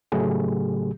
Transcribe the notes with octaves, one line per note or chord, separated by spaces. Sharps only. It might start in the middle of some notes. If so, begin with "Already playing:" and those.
A2 C#3 F#3 A3 G4 G#4